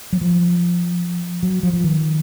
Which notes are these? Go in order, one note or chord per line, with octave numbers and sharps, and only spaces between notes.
F#3
F3
F#3
F3
F3
D#3